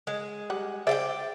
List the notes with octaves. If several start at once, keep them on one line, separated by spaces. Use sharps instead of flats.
G#3
G3 F#5
G#4 C5 D5 E5 F5 G5